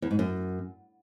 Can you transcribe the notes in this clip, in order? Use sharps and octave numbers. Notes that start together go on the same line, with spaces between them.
E2
G#2
F#2